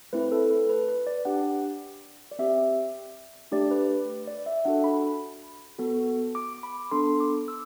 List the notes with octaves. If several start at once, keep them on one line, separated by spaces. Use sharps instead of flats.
A3 C4 E4 B4
A4
B4
B4
B4
D5
D4 G4 F#5
D5
C4 G4 E5
A3 D4 G4 D5
B4
D5
E5
D4 F#4 A4 F#5
B5
B3 F#4 A4
D6
B5
B3 D4 A4 C6
D6
E6